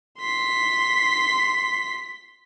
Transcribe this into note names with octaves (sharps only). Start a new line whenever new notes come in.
C6 B6